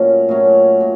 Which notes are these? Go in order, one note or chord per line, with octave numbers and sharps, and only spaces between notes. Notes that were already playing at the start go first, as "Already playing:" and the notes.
Already playing: A#2 F#3 A3 C#4
A#2 F#3 A3 C#4
A#2